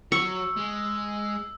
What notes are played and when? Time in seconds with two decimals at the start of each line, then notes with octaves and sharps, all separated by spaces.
0.12 F#3 C#6 E6
0.57 G#3